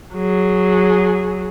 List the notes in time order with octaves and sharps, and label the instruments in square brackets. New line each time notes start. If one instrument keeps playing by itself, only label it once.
[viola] F#3 G#4